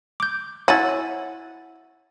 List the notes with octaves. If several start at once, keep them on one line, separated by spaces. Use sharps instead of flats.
D6 G6
E4 F#4 C#5 G#5 A6